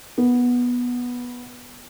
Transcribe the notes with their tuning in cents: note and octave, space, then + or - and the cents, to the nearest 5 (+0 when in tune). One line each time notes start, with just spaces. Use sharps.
B3 -10